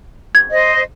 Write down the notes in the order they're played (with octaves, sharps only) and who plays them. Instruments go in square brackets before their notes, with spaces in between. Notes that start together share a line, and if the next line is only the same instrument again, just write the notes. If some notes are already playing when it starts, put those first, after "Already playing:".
[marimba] G#6
[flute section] C5 D#5